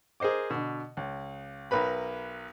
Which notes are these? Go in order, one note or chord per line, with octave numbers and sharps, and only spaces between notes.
G#4 A#4 C5 D#5 D6
B2 D3
C#2
B1 A#4 B4 B5